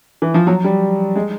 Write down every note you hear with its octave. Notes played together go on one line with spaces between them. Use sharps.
E3
F3
F#3
G3
G#3